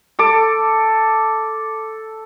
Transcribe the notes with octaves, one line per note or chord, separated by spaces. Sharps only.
A4 D6